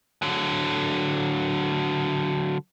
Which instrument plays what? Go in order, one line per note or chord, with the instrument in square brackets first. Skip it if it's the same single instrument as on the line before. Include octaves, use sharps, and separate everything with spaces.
[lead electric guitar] D3 F#3